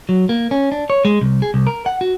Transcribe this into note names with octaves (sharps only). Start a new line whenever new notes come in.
F#3
A#3
C#4
D4
C#5
G#3
C2
G#4
C2
A#4
F#5
F#4